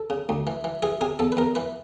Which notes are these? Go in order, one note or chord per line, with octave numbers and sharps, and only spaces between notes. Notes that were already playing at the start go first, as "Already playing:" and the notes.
Already playing: A4
C#3
D2
E3
E3
E3 G#4
C3 G#4
E2 A4
B4
E2 A#4
E3 B4